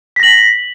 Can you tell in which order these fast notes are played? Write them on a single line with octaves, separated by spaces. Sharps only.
B6 A#6 F#7